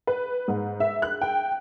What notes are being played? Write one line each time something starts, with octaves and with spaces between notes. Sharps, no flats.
B4
G#2
E5
F#6
G5